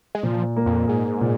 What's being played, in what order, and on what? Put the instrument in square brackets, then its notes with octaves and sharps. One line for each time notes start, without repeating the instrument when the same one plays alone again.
[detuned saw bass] G#3
[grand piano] A#2 [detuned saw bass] F3
[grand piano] A#3
[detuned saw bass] F2
[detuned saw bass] G#2 [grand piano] G#4
[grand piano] A#2